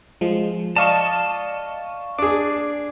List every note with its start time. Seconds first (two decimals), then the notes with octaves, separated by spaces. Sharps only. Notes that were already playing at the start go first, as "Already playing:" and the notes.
0.21 F3 G#3
0.76 D5 D#5 F5 A5 C#6
2.18 D4 G#4 D6